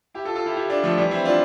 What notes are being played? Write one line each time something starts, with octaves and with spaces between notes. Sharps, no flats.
E4 G4
F4 A4
F4 A4
E4 G4
E4 G4
D4 F4
F3 A3
E3 G3
C4 E4
D4 F4